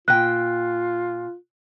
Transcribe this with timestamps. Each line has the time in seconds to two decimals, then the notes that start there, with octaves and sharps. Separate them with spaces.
0.08 A#2 F4 G5 F#6